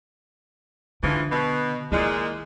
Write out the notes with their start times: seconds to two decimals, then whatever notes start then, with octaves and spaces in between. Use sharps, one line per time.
1.03 G#2 D3 E3 F3
1.30 B2
1.92 A#2 D#3 G#3 E4